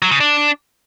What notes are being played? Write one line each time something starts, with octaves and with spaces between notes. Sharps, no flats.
F#3
C#3
D4